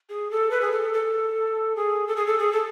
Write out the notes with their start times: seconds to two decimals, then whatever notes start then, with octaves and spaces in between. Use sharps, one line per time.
0.09 G#4
0.30 A4
0.50 B4
0.61 G#4
0.71 A4
0.93 A4
1.75 G#4
2.07 A4
2.16 G#4
2.26 A4
2.38 G#4
2.52 A4